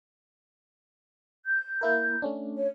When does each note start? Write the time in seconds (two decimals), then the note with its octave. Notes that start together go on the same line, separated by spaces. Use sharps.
1.45 G6
1.81 A#3 E4 A#4
2.22 A3 C#4 D4
2.55 C#5